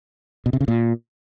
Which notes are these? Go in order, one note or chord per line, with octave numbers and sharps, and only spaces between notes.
B2
C3
C#3
A#2